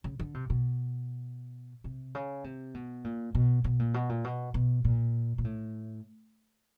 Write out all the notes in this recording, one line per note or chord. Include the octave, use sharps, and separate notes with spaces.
C#3
D3
C3
B2
C3
C#3
C3
B2
A#2
B2
B2
A#2
B2
A#2
B2
B2
A#2
A#2
A2